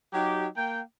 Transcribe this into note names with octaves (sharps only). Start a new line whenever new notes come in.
F#3 D#4 G4
A#3 G5